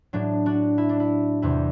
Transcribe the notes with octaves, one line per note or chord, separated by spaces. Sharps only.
A2 F#3 D4
D4 F#4
E4
D4
E4
E2 C3 G3 E4